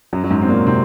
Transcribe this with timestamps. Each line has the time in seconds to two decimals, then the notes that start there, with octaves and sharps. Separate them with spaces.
0.13 F#2 F#3
0.24 F#3
0.30 G#2 G#3
0.42 C4
0.49 A#2 A#3
0.67 C3 C4